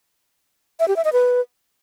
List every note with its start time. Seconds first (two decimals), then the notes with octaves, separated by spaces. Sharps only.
0.80 E5
0.88 G4
0.96 E5
1.05 D#5
1.13 B4